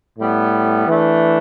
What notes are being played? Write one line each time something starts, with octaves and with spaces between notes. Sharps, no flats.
A2 G3 B3
E3 A3 D4